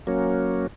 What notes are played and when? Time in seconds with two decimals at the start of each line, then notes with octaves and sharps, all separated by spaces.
0.07 F#3 A#3 C#4